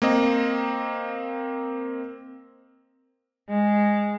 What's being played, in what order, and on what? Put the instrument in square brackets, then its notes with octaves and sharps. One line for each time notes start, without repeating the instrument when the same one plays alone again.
[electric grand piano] A#3 C4 D#5
[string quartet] G#3